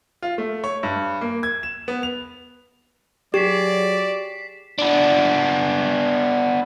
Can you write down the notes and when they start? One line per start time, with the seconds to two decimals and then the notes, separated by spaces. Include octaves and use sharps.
0.22 F4
0.38 A3
0.64 C#5
0.83 G2
1.21 A#3
1.43 G#6
1.63 E7
1.88 B3
2.03 F7
3.34 F#3 G4 G#4 D5 B6 C7 E7
4.79 B3 D4